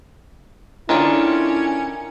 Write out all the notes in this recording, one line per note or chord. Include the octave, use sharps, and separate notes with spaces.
D3 D#3 C#4 D4 E4 F4 C#5